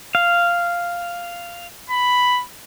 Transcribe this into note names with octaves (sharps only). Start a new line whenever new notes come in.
F5
B5